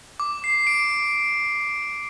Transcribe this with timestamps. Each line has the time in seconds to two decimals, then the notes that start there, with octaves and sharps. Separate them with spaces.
0.20 D6
0.44 C7
0.67 D7